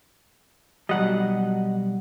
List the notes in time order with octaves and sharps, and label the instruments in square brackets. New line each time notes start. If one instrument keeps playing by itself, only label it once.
[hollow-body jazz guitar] B1 F#3 G3 [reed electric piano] D#5 F#5